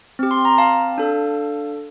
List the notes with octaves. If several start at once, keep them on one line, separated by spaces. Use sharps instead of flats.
C4 G4
C6
A#5
F5 A5
D4 A4